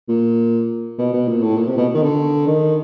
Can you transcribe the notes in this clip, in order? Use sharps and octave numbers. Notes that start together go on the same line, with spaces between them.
A#2
B2
B2
A#2
A2
A#2
C3
B2
D#3
D3
D#3